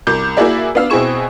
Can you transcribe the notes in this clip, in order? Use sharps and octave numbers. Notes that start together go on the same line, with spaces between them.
C2 D6 G6
A#3 E4 F#4 G#4 D5 E5
B3 D4 F5 E6
B2 C4 E4 G#4 C#6 E7